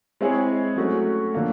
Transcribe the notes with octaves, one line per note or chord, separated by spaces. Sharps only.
G#3 C4 E4 G#4 C#5
F#3 A3 C#4 F#4
D3 F3 A#3